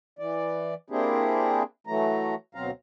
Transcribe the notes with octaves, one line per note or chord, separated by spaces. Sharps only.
E3 D5
A#3 C4 D4 E4 G4 G#4
E3 F#3 A3 A#5
D2 B2 F#3 C4 F5 A#5